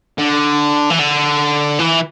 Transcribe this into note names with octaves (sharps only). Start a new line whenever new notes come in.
D3
E3
D3
E3